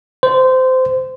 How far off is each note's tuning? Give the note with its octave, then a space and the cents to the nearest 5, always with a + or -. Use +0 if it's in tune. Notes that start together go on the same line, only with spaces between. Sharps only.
C5 -20